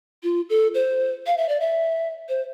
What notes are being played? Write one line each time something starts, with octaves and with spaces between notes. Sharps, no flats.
F4
A4
C5
F5
E5
D5
E5
C5